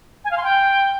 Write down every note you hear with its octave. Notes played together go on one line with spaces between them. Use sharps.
G#5
F5
C6
G5